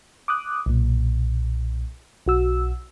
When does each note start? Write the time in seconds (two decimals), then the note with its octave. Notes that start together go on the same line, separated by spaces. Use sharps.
0.28 D6 D#6 F#6
0.66 B1 A#2
2.26 B1 F#4 E6